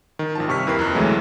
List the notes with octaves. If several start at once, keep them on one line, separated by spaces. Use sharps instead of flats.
D#3
G#1 F3 A5
G2 C3 C#6 F6 B6
D#2 E4 A#4 B4 C7
F2 A#5 F#6
D2 A2 E3 F#3 G#3 A3